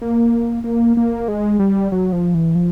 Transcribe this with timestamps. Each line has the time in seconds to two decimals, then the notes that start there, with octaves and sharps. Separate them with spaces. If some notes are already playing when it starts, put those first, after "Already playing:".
0.02 A#3
0.64 A#3
0.97 A#3
1.28 G#3
1.59 G3
1.92 F#3
2.12 F3
2.35 E3
2.55 F3